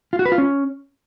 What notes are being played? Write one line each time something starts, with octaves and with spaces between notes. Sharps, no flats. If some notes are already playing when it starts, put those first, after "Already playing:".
F4
F#4
B4
F4
C#4